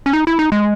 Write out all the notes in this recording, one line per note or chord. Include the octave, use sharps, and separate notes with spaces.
C#4
D#4
E4
D#4
G#3